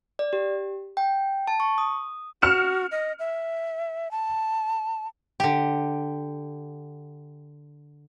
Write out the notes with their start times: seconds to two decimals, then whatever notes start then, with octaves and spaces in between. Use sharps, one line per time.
0.19 D5
0.33 G4
0.97 G5
1.48 A5
1.60 C#6
1.78 D#6
2.42 F#4 F6 C#7 E7
2.91 D#5
3.19 E5
4.11 A5
5.40 D3 G4